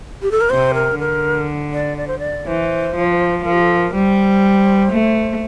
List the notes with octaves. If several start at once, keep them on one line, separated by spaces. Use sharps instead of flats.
G4
A4
A#4
C3 C5
A#4
D3 A#4
D5
D5
C5
D5
E3 C5
F3
F3 A#4
G4
A4
A#4
G3 C5
A3